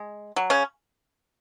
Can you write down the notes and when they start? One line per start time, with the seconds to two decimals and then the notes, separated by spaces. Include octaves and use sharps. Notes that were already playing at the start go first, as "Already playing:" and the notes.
Already playing: G#3
0.36 F#3
0.50 C#3 C#4